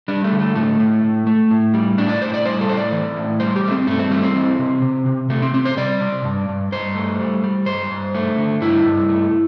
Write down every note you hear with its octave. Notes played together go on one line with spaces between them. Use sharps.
G3 D4
A3
D3
A3
A2 A3
A2
A2
A3
A2
G3
A2 D4
D5
A2 C5
D5
G3 C5
A4
A2 C5
D5
E3
A2
G3 C5
G4
G3 A3
C4
G2 A3
C4
G3 A3
C4
E3
C3
C3
C3
C3 A3
C4
C3 C4
C5
G3 D5
C3
G2
G2
G2 C5
A3
G3
G3
G2 C5
G2
A3
D3
G2 E4
G2
A3